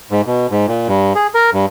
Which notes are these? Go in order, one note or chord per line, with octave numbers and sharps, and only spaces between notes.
G#2
B2
G#2
A#2
G2
G#4
A#4
G2